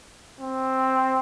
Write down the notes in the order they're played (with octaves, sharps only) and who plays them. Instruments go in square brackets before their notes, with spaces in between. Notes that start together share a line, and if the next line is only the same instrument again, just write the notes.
[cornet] C4